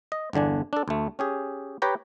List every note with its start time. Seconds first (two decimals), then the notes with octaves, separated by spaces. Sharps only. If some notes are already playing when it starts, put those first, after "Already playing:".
0.12 D#5
0.33 G1 E2 D3 D4 G#5
0.73 D4 A4
0.88 D2 A3
1.19 C#4 G4 G#4
1.82 G4 B4 C#5 G5 A#5